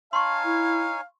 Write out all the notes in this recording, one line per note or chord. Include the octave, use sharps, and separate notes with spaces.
D#4 C#5 F5 G#5 A5 C6 C#6
E4